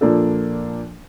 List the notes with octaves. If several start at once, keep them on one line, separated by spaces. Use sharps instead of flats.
A#2 F3 A#3 D4 A4